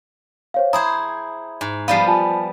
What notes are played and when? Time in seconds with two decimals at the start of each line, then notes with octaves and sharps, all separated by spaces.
0.54 C5 C#5 F5
0.73 E4 G#4 C5 A#5 D#6
1.61 G#2
1.88 F3 G3 B3 F5 C7
2.07 F4 G#5 A5